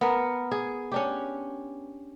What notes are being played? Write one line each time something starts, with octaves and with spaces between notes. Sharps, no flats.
B3 A#4
G#4
C#4 D4 G4